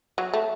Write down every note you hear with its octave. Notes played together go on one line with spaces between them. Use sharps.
F#3
A3